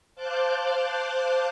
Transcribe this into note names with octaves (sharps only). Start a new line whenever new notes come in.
C5 F5 A5 D6 F#6 G6